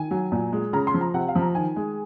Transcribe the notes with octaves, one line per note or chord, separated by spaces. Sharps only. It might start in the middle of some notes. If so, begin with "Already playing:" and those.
Already playing: D#3 G#5
F#3
A#2
G#3
C#3 A#5
C6
F3
A#5
C3 F#5
F5
F3
A#5
D#3 G#5
G#3